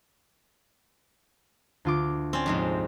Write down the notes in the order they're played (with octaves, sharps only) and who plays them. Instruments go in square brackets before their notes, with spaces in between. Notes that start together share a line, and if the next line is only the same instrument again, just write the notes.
[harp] D2 F4 D6
[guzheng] C4 C#4 D5
F2 G#2 C3